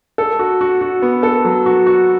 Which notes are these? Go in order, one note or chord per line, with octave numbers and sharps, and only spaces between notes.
A4
F#4
F#4
F#4
B3
A4
F#3
F#4
F#4